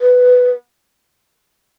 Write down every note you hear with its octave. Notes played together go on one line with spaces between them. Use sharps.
B4